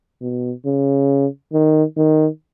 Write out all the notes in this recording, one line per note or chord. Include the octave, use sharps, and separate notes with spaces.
B2
C#3
D#3
D#3